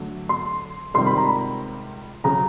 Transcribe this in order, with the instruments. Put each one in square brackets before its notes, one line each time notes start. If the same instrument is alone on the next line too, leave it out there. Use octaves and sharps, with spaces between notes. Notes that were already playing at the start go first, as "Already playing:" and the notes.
Already playing: [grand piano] D3 F#3 A3
[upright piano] C6
[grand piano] C#2 C3 D#3 G3 [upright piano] C6
[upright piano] B5
A#5
B5
[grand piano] C#3 F#3 [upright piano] A#5